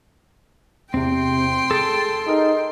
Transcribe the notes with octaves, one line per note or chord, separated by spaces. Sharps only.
E2 C3 C4 G5 C6
G#4 A4 A5
D#4 G#4 A#4